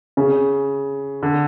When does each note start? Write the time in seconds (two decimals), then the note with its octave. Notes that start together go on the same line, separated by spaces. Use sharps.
0.17 C#3
1.23 D3